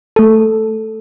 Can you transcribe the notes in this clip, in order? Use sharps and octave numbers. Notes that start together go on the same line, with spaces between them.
A3 A4